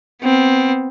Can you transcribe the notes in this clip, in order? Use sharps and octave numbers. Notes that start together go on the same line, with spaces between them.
B3 C4